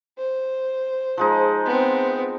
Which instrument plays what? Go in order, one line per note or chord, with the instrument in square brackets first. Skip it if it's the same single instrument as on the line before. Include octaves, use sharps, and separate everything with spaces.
[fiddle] C5
[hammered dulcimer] F3 G#3 D#4
[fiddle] B3 C4